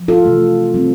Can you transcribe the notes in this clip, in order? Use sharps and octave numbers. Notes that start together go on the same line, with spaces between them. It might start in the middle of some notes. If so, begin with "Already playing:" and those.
Already playing: F3
F4 A4
C3 E3 A3
C3 G3 C4